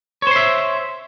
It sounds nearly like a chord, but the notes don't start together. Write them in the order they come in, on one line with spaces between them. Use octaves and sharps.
C#5 C5 C6 E5